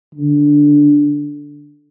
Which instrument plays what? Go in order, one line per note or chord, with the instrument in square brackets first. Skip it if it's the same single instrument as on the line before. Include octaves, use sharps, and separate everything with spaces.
[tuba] D3